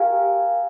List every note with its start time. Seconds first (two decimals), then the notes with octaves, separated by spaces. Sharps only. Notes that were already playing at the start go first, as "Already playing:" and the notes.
Already playing: G4 A#4 F5 G#5